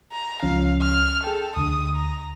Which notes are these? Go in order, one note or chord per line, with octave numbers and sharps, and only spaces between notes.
A#5
C#2 F3 C#4 F5
F6
G#4 A4 G5
D2 D3 D#6
A#5